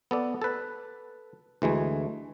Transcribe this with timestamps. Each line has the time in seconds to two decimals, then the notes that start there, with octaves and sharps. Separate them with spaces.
0.11 B3 A4 D5
0.42 A4 B4
1.62 D2 E3 G#3 A3